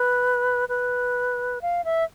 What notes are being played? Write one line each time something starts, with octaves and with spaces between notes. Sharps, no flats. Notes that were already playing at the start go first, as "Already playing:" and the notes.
Already playing: B4
B4
F5
E5